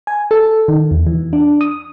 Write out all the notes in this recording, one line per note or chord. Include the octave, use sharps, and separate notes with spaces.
G#5
A4
D#3
E2
E3
D4
D#6